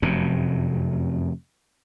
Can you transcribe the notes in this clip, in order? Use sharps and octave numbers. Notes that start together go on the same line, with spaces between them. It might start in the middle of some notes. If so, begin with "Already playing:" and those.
F1 F#2 C3